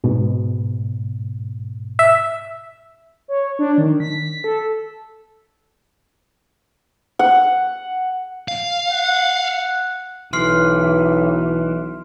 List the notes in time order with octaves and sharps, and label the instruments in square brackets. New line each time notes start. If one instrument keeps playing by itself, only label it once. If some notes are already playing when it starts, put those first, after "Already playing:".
[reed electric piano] G#2 B2
[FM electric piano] E5
[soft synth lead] C#5
D4
D#3
B6
A4
[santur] F#5
[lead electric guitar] F5
[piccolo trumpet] F#5
[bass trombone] B1 [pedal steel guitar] E3 [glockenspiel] C6 F6 C7